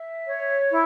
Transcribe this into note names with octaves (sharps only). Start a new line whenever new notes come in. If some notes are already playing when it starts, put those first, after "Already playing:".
Already playing: E5
C#5
E4